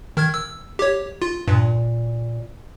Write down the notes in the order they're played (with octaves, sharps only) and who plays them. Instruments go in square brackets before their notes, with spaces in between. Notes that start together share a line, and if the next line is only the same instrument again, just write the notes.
[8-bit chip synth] D#3 F6 G#6
E6
G4 C#5
F4
[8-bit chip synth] G2 [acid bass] A#2